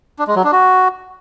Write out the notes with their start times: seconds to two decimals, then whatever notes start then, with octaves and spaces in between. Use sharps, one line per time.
0.19 D4
0.27 G#3
0.36 F#3
0.44 D4
0.52 F#4